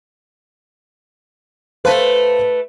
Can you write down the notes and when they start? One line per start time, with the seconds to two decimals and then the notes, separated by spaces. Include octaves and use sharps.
1.85 A3 B4 C5 F5 A5